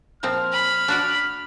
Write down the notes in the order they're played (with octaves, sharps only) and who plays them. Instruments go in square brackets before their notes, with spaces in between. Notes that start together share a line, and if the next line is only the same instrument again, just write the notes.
[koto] A#2 F3 C4 [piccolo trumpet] F6
[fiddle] B5
[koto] D4 F#4 D5